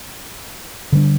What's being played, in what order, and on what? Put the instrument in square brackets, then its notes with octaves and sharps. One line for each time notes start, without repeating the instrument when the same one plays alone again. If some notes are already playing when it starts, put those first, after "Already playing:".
[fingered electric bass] D3 G3 D4